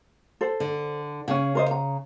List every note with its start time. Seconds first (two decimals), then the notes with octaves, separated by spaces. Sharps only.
0.41 A4 C5
0.60 D3
1.28 C#3 C#4 G#5
1.55 A#4 C5 D#5
1.71 A#5